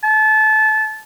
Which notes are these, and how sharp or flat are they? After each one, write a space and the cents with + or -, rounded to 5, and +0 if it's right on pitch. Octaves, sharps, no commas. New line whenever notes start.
A5 -25